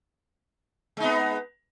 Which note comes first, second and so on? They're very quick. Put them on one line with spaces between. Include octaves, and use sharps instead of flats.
G#3 D#4 B3